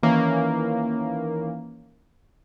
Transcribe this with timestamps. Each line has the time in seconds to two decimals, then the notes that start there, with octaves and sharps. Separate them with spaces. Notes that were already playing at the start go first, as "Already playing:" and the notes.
0.03 D#3 E3 A#3 C#4